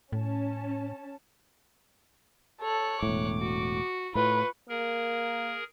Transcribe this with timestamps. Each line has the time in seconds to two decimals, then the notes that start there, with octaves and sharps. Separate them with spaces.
0.12 A2 C#4 A5
2.62 A4 C#5 F#6
3.03 E1 A2 D6
3.40 F#4
4.15 A2 F4 B4 C#6
4.69 A#3 G#4 A#4